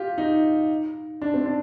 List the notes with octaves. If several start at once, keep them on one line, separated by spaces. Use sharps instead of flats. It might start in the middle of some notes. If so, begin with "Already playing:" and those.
Already playing: F4 G4
D#4
D4
C4
D4